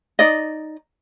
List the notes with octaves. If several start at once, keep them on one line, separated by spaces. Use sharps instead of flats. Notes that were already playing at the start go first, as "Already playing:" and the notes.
D#4 D5 D#5